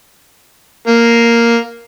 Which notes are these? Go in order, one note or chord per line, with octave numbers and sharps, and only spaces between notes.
A#3